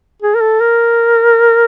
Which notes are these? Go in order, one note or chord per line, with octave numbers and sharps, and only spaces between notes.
G#4
A#4
A4
A#4